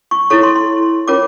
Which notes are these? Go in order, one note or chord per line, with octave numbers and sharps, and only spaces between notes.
C#6
E4 A4 C#5 C#6
C6
C6
C#4 F4 A#4 C#5 D6